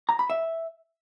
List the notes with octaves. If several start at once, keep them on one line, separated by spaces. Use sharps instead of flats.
A#5
B5
E5